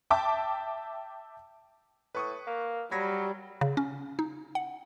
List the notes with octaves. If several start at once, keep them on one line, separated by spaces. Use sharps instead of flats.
E5 G5 A5 D6
A2 B4 C#6 D#6
A#3
F#3 G3 B5 G#6 A#6
C#3
C#4
D#4
F#5